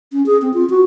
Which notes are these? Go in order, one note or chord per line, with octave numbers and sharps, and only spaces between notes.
C#4
G#4
C4
F4
F#4